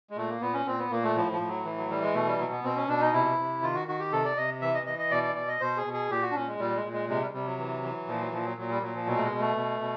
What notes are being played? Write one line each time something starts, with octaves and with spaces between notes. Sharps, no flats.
G#3
A#2 A3
A#3
A#2 B3
C#4
A#2 C4
B3
A#2 A#3
A3
A2 F3
F3
A2
F#3
E3
F#3
E3 G3
G#3
B2 A3
G3
B2 F#3
B3
B2 C4
C#4
B2 D4
D#4
C3 E4
C3
D#3 F4
F#4
D#3 F#4
G4
C3 A4
D5
C3 D#5
E3 E5
D#5
E3 D#5
D#5
B2 D5
D5
B2 D5
D#5
B2 C5
G#4
B2
G#4
A#2 G4
F#4
D4
A#2 C#4
G#3
A#2 G3
G#3
A#2
G#3
C3 G#3
G3
C3 G3
F#3
E3
E3
A#2 F3
F#3
A#2 F3
F#3
A#2 F#3
G3
A#2 F#3
F3
B2 F#3
A3
G#3
B2
A3
B2
B2